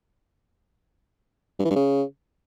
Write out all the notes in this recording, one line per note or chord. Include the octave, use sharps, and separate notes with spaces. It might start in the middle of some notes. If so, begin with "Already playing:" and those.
G2
E3
G2
C#3